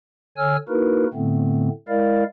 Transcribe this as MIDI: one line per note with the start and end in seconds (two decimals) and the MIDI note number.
0.37 0.56 50
0.37 0.56 73
0.37 0.56 80
0.37 0.56 88
0.37 0.56 89
0.69 1.06 58
0.69 1.06 63
0.69 1.06 64
0.69 1.06 66
0.69 1.06 70
0.69 1.06 71
1.13 1.68 45
1.13 1.68 50
1.13 1.68 57
1.13 1.68 59
1.13 1.68 60
1.88 2.24 56
1.88 2.24 64
1.88 2.24 70
1.88 2.24 74
1.88 2.24 77